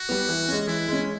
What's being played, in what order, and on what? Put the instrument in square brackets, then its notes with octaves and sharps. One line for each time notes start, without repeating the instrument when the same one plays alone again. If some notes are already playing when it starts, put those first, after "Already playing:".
Already playing: [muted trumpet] F#4
[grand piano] G3 B3
E3
G#3 C#4
[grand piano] E3 [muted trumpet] E4
[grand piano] G#3 C#4